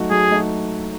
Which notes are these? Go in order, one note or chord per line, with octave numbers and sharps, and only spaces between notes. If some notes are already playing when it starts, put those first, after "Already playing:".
Already playing: F#3 A3 D#4 F#4
F#3 G#4
A3 D#4 F#4